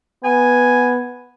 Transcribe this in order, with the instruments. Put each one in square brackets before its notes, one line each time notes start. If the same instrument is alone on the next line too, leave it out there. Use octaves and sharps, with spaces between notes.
[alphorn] B3 [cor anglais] G#5